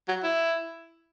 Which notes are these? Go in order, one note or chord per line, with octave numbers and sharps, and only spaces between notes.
F#3
E4